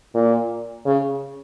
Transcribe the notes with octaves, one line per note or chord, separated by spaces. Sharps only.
A#2
C#3